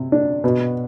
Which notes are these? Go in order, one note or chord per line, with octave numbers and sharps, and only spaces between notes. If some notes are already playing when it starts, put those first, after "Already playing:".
Already playing: C3
D4
B2